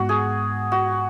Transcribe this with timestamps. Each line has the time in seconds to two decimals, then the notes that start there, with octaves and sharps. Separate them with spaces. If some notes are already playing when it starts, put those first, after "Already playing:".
Already playing: G#2 G#3 B3 F#4
0.09 G#4
0.72 F#4